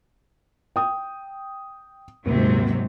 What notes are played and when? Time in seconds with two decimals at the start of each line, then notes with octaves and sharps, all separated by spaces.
0.76 G5 D#6
2.26 D#1 G#2 C3 F#3